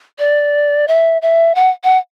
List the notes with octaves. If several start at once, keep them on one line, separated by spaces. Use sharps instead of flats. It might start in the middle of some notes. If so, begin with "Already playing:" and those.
D5
E5
E5
F#5
F#5